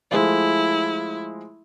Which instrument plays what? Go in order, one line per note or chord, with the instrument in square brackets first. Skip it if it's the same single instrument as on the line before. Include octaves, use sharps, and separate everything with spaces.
[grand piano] F3 G#3 A3 [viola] E4